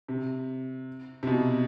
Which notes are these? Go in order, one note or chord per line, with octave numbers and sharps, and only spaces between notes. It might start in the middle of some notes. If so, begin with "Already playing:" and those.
C3
C3
B2